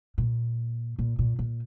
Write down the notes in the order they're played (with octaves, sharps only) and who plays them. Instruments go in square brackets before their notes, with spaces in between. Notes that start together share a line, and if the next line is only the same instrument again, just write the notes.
[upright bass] A#2
A#2
A#2
A#2